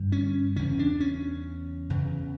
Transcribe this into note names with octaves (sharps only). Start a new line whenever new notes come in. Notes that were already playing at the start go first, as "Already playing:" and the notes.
Already playing: G2 D3
C#4
E2 C#3 C#4
D4
C#4
E2 C#3